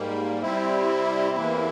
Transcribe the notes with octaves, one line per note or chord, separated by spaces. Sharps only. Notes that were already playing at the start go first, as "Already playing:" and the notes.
Already playing: G#2 G3 A#3
C3 G3 C4 E4
E2 C3 E3 A#3